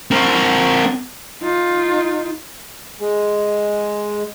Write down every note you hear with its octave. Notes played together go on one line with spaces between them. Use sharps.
C4 A#4
D#4 F4
G#3